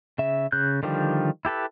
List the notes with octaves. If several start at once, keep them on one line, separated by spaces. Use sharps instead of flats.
C#3 E5
C#3 F#6 G6
D3 D#3 F3 G3 G4
E4 G4 A4 B4